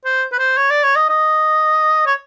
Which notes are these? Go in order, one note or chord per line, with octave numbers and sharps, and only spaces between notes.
C5
B4
C5
C#5
D5
C#5
D#5
D#5
C#5